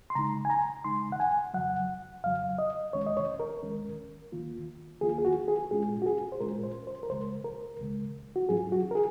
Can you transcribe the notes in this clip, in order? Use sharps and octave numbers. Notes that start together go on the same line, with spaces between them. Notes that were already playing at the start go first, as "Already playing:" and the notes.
C6
C#3 G#3 D#4 A#5
G#5
A#5
C#3 G#3 D#4 C6
F#5
G#5
F2 C#3 F#3 F#5
F2 C#3 F#3 F5
D#5
D#2 D#3 G#3 C#4 C#5
D#5
C#5
A#4
D#2 D#3 G#3 C#4
D#2 D#3 A#3 F4
D#2 D#3 A#3 F4 G#4
G#4
F#4
G#4
A#2 G#3 C#4 F4 G#4
F#4
G#4
C5
A#2 G#3 C#4 F4 A#4
C5
C5
A#4
C#2 C#3 G#3 C5
A#4
C#2 C#3 G#3
F#4
G#2 F#3 C#4 F4 G#4
F#4
A#4
G#4